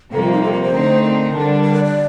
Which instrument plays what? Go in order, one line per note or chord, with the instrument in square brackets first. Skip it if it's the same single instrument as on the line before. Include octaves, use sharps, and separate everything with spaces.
[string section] F2 C3 G3 A#3 [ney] A4
[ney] F4
D#4
A4
A#4
C5
[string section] D3 A3 C4 D#4
[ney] A#4
[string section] D3 G3 D4
[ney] A#4
D5
D5